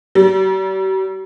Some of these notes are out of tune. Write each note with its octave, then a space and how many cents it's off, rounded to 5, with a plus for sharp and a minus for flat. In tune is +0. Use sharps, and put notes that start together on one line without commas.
G3 -45